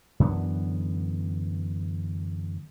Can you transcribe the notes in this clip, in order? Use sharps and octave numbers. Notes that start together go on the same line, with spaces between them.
F#2 D3 E3 B3